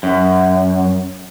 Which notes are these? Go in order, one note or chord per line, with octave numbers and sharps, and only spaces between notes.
F#2